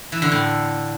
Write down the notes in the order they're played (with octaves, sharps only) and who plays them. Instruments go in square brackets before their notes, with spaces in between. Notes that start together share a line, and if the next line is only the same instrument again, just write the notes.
[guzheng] E3
D3
A2